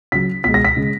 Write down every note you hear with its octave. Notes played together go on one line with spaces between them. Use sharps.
C#3 F#3 B6
B2 G#3 B6
A#6
B6
C#3 G#3